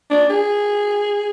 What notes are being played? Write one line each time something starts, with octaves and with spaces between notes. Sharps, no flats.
D4
G#4